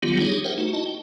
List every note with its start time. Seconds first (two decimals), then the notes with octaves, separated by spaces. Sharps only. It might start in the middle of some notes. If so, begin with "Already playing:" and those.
0.03 D#3 F#3 G3 B3 F4 G4
0.20 D4 D#4 G4 G#4 C#5
0.44 A#4 C5 C#5 E5 F#5 G5
0.58 A3 D#4 F#4
0.73 D#4 E4 F#4 D#5 A5
0.86 G5